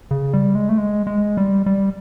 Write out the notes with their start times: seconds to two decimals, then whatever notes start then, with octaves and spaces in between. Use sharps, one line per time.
0.11 C#3
0.33 G3
0.55 G#3
0.69 A3
0.78 G#3
1.07 G#3
1.37 G3
1.66 G3